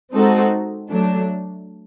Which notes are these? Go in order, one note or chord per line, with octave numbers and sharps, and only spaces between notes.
G#3 C4 D#4 F#4 A4
F#3 A3 D4